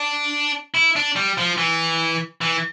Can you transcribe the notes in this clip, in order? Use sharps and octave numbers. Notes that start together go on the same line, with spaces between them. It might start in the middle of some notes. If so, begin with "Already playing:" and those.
Already playing: D4
E4
D4
G3
F3
E3
E3